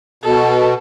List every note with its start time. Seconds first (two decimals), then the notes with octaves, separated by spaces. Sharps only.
0.24 B2 A4